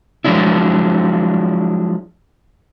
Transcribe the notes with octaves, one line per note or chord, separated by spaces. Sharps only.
F3 F#3 G#3 D4 E4